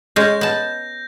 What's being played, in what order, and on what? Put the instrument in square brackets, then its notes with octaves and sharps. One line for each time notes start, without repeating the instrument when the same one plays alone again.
[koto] G#3 C#4 [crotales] G6 A#6
[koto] B3 A5